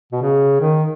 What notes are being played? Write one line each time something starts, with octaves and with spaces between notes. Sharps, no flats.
B2
C#3
D#3